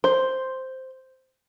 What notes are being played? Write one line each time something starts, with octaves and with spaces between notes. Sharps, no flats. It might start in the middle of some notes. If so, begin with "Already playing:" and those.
C5